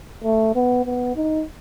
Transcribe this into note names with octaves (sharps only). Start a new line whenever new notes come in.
A3
B3
B3
D#4